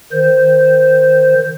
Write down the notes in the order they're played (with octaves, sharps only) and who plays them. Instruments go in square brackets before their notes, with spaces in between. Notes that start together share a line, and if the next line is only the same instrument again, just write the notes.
[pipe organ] D#3 C5